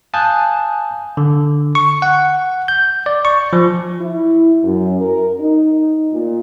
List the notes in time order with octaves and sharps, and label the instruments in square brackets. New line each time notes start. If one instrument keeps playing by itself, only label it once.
[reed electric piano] F5 G#5 A5 D#6 F#6 G6
[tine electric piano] D3
C#6
F#5
G6
D5
C#6
F3
[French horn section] E4
F#2
A#4
D#4
A#2